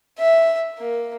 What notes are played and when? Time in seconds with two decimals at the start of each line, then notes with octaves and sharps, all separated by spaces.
0.19 E5
0.79 A#3